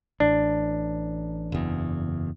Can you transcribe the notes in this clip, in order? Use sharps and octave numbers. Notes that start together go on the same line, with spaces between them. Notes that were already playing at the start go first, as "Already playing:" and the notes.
A1 D4
F#1 E2